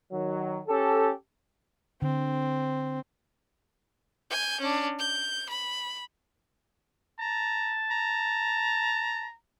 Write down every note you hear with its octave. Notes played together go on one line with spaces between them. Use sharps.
D#3 F#3
C#4 G4 A4
D3 C4
G#5 G6
C#4 D4
G6
B5
A5 A#5
A#5